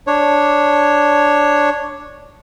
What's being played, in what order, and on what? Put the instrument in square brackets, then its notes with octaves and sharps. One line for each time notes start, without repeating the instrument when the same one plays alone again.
[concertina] D4 C#5